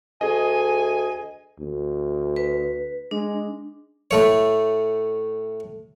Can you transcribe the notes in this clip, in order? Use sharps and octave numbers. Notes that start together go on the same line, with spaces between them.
D2 G#4 D#5 G#5
D2
B4
G#3 D4
A2 A3 C#5